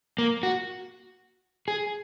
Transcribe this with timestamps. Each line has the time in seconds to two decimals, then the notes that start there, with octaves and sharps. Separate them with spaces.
0.18 A#3
0.43 F#4
1.68 G#4